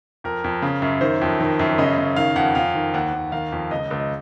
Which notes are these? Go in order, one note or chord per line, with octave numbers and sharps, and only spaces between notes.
F2 A#4
F2
C#3
F#2
D#3 C5
F2
D#3
F#2
C#3 D#5
C#3
D#3 F5
F2 F#5
F2 F5
D#3
D#2 F#5
D#2
D#3 F5
F2
C#2 D#5
C#2
D#5